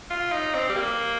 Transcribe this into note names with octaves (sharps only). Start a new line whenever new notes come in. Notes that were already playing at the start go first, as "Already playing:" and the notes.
F4
D#4
C4
G3
A#3